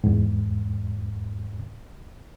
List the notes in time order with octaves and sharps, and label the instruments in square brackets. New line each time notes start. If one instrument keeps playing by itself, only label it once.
[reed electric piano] E2 G#2